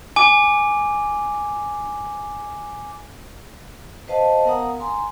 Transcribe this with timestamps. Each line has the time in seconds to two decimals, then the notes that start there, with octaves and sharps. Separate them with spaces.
0.16 G#5 D6
4.07 B4 C5 D#5 F5 A5
4.45 B3 A#4 F5 F#5 A#5 D#6
4.80 G#5 A#5 C6